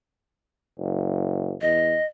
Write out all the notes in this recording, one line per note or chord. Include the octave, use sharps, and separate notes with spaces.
F#1
E2 D#5